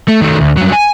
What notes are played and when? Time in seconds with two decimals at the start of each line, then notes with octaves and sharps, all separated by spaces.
0.08 A3
0.21 D#3 A3
0.41 D2
0.57 G2 F#3
0.73 G#5